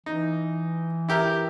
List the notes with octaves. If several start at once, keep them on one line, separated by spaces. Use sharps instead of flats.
E3 D#4
E4 G4 A#4